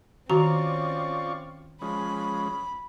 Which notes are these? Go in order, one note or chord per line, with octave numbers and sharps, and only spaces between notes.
D#3 C4 C#4 F4 F#4 D5 A#5 C#6
F3 G#3 C#4 B5